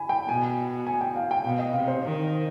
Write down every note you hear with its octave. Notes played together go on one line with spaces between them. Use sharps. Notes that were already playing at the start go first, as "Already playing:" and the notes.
Already playing: G#5 B5
G5
B2 G#5
G#5
G5
F5
G5
B2 F5
D#5
C3 F5
C5
D#3